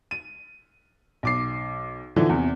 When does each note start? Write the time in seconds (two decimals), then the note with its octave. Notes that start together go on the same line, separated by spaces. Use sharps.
0.11 D#7
1.23 B1 D6 C7
2.16 D3 E3 F3 D#4
2.29 E2 C3